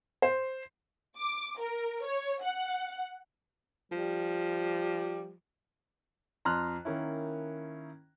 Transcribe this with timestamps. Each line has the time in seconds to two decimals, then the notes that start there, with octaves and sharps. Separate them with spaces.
0.22 C5
1.17 D6
1.59 A#4
2.04 C#5
2.42 F#5
3.92 F3 G3
6.45 F2 A#5 C6 F6 F#6
6.85 D#3 A#3 C#4 E4